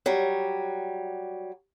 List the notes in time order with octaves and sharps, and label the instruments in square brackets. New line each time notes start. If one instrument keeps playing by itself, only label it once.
[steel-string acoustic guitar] F#3 G3